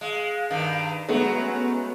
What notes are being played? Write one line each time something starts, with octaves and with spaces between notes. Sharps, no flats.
G#3 F5
G2 D#3
F#3 G#3 A3 B3 F#5
C#4